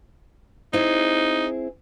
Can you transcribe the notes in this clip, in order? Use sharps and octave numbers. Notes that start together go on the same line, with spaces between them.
C4 D#4 E4 G#4